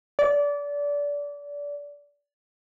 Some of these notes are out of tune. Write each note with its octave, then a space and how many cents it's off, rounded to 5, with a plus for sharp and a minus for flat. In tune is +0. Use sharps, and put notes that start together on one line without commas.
D5 -25